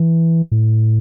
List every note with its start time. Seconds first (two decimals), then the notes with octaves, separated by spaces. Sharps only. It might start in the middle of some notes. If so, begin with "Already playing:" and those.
Already playing: E3
0.52 A2